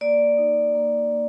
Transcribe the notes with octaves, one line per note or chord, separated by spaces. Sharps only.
A#3 D5
D#4
A#3
A#3